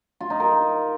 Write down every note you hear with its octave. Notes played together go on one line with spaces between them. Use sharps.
F4
D#4
A#4